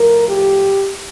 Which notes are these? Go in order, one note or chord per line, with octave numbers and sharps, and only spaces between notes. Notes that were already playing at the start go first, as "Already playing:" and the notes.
Already playing: A2 F3 A#4
G4